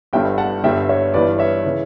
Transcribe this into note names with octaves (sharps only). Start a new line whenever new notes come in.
G1 G2 D3 E5 G5
F#5 A5
G1 G2 D3 E5 G5
C#5 E5
G1 G2 E3 B4 D5
C#5 E5
C#3 E3